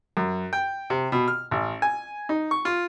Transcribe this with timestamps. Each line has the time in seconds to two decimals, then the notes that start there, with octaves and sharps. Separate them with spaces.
0.17 F#2
0.53 G5
0.90 C3
1.12 B2
1.28 F6
1.51 A1
1.82 G#5
2.29 D#4
2.51 C#6
2.65 F4